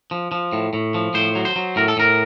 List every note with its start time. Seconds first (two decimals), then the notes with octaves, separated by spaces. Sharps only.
0.11 F3
0.32 F3
0.53 A2
0.73 A2
0.94 F3
1.14 A2 C5
1.35 F#3
1.45 C5
1.56 F#3
1.76 A2 A#4
1.88 A4
1.97 A2 A#4